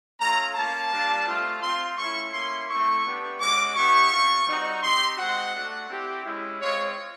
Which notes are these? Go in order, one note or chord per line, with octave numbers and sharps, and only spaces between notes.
A3 C#4 F4 A#5
A#3 C#4 F4 A5
G3 A#3 D4 F4
A3 C4 F4
C4 F4 C6
A3 C#4 E4 C#6
A#3 C#4 E4 C6
A3 C4 E4 C#6
B3 D4 G4
G#3 C#4 F#4 D6
B3 E4 G4 C#6
C4 F4
G3 C4 D#4 F#4
C4 D#4 G4 C6
G#3 C4 D#4 F#4 F#5
A3 D4 F#4
C4 E4 G4
G#3 C#4 E4
G#3 C4 F4 C#5